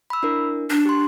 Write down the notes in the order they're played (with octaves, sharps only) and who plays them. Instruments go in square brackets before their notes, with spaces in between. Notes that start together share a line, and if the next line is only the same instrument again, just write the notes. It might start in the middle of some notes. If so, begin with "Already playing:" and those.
[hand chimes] B5 E6
D4 E4 A#4
[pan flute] D4
[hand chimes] G4 C6